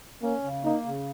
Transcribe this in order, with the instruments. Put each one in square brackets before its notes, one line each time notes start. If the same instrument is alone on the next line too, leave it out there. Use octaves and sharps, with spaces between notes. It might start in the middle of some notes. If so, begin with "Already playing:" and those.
[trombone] A#3 [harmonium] C#4
[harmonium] C#3
[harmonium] A#3 [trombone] D#4
[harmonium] C#3